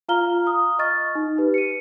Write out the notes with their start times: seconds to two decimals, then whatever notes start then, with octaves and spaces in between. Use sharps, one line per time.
0.09 F4 F5 A#5 F6 G7
0.47 D#6
0.79 D#5 C#6 F6 A6
1.15 D#4
1.38 G4 B4
1.54 C#7 D#7